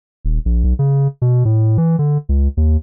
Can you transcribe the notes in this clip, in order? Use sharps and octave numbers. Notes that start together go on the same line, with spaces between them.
D#1
A#1
B1
C#3
B2
A2
E3
D3
C#2
D#2